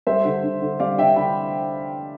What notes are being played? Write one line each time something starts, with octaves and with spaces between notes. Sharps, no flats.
G3 C5 E5
D3
D3
D3
G3 D5 F5
D3 E5 G5
D3 G5 B5